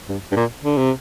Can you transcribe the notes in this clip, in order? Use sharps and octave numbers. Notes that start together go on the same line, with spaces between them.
G2
G2
A#2
D3
C3